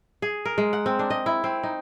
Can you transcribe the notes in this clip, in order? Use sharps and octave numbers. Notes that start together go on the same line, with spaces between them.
G#4
A#4
G#3
F#5
C4
D4
D#5
E4
C4
D#4